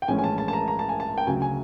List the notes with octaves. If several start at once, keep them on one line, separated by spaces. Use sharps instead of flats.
G5
A#1 A2 E3 G#3 C#4 G#5
G#5
A5
A5
A5
A#5
A#5
A5
G#5
A5
G5
D2 C#3 F#3 G#5
G#5